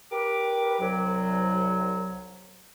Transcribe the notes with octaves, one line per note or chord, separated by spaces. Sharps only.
G4 A#4 B4 D6
C2 F#3